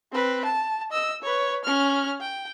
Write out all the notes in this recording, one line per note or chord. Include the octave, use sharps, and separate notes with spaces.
C4 B4
A5
D#5 E6
B4 C#5
C#4 F6
G5